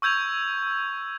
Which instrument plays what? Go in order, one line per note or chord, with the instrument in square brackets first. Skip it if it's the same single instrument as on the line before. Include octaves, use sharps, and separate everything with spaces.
[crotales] C#6 E6 G6 G#6 F7